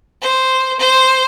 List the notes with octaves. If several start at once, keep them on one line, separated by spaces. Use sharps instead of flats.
C5
C5